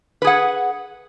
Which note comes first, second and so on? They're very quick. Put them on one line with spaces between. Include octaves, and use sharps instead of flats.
B4 G#4 F#5